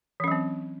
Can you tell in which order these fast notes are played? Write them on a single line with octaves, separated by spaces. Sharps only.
E3 C#4 F#3 C4